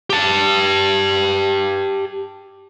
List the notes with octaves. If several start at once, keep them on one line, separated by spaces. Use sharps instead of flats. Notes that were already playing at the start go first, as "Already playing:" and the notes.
G4 A5